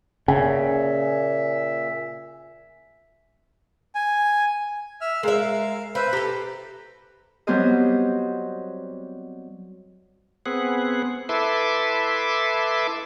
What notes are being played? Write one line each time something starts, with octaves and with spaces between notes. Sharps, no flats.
A#2 C#3 E5 G#5
G#5
E5 E6 F6
G#3 A#4 E5 F5
B4 C5 E5 B5
G4 A4 B4 A#5
F#3 G3 B3 C4 C5 D#5
B3 C4 G#4 F#5
E4 A4 B4 E5 C6 D6